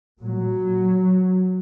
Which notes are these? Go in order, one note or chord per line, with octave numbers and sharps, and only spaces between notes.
A#2 F#3